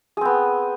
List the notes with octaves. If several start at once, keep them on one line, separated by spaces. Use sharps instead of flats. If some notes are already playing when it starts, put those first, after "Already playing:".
B3 C4 G#4